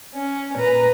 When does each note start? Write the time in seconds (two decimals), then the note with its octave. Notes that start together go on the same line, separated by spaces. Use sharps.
0.15 C#4
0.56 A#2 B4 A#5